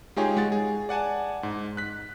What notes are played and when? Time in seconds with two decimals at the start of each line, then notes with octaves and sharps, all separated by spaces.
0.16 G#3 D#4 F4 G4 G#4 C#5
0.37 G#3 F#5 A6
0.52 G#4
0.89 D5 F#5 G#5 A5
1.43 G#2
1.77 F#6 B6